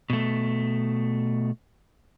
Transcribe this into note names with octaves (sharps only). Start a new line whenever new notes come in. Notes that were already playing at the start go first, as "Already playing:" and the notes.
B2 A3